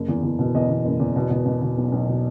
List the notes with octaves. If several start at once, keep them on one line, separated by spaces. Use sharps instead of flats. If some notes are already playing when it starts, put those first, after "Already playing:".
Already playing: F#1
E2
E2
B2
E2 D#5
E2
F#1
E2
B2
B2
B2
B2
B1
B1
B2